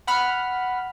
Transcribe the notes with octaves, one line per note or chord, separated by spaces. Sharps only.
F#5 B5 F6